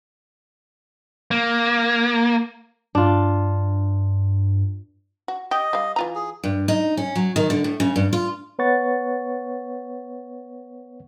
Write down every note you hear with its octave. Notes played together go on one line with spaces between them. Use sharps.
A#3
G2 D4 F4
F#4
G4 D#5
G3 F5
E3 F4 A#5
G#4
G2
D#4
C#4
F#3
D#3
D3
A2
C#3
G2
F4
B3 B4 C#5 F#5 C#6 A6